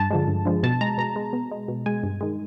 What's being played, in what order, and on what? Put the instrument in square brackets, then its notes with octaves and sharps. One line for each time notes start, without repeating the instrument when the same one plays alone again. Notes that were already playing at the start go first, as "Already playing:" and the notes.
Already playing: [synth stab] G2 A5
D3 F3 G#3
G2
D3 F3 G#3
B2 A5
G#3 A#5
B2 A#5
G#3
B2
G#3
B2
G#3 G#5
G2
D#3 G#3